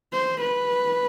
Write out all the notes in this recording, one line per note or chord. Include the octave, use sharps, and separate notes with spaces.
C5
B4